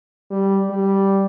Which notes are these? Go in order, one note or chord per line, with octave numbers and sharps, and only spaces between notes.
G3
G3